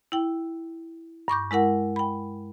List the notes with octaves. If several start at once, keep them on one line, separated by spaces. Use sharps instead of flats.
E4 G5
G2 C#6 D6 G6
G#3 E4 A#4 F#5
G5 B5